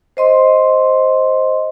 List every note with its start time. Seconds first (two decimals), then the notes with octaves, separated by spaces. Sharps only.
0.17 C5 D#5 C6